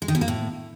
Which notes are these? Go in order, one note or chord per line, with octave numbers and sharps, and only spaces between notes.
G#3
D#3
B2
A#3
A2